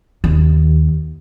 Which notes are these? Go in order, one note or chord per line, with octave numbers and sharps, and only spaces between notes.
D#2